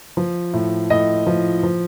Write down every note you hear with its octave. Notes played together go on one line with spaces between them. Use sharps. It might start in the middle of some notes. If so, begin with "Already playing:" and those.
F3
A2
A2 D#5
F3
F3